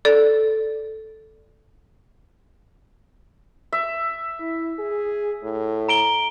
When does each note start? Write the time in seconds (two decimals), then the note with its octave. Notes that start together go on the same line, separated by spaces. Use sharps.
0.05 A4 D5
3.73 E5
4.40 E4
4.79 G#4
5.43 A2
5.89 A#5 D7 G7